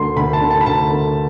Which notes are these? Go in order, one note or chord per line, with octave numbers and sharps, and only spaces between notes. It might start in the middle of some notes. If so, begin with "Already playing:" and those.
Already playing: D2 D3 C6
D2 B5
A5
D3
A5
B5
D2 A5
D3